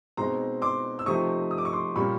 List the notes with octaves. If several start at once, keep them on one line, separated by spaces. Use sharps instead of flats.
B2 G#3 C4 D#4 A#5 C6
C6 D6
E6
C3 F3 A3 C4 D#4 C#6 D#6
D#6
D6
C#6
C6 D6
A#2 G3 A#3 C#4 B5 C#6